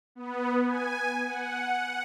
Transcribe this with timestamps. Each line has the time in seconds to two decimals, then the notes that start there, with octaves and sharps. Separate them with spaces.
0.15 B3
0.66 G#5
1.26 F#5